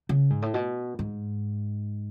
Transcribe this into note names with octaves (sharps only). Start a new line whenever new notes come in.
C#3
G#2
A2
B2
G#2